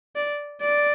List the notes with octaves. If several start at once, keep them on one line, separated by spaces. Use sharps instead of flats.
D5
D5